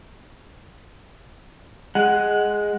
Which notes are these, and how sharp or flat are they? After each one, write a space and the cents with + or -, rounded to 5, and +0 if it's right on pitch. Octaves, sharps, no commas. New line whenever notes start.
G#3 +0 F#5 +0